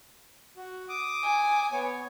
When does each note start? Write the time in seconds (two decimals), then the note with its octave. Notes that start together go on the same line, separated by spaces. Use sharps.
0.56 F#4
0.89 D6 D#6
1.23 G#5
1.72 B3 C#5